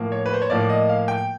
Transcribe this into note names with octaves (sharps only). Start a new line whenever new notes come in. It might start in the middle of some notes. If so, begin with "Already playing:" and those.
Already playing: A2 F3 A#3
C#5
B4
C5
C#5
A2 F3 A#3 D5
D#5
F5
G5